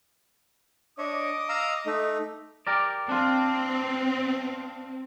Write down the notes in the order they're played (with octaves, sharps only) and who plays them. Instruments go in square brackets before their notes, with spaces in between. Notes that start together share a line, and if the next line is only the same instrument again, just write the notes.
[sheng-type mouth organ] D4 C#5 [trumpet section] D#5 D6
[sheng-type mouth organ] F5 A#5 E6
A3 D#4
[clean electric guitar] G4 A#4 D5
[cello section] C4 [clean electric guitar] D4 F4